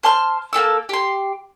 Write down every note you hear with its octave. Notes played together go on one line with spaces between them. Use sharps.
C5 A5 C6 F6
A#3 G4 A4 E6
G4 C6